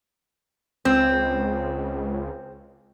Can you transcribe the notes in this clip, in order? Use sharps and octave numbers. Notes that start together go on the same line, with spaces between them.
C#2 C4